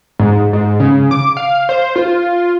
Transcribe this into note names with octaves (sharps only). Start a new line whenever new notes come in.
G#2
G#2
C#3
D6
F5
C5
F4